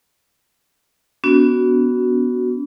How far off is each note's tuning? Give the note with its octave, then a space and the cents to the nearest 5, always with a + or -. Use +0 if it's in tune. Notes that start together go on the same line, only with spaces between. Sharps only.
B3 +0 D4 -45 F#4 +0